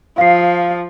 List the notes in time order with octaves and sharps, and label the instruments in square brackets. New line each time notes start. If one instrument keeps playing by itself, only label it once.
[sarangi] F3 [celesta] F5 C7